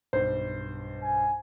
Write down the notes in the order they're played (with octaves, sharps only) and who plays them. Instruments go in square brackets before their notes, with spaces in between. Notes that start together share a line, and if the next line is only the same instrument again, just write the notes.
[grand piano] B1 G2 [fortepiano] C5
[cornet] G#5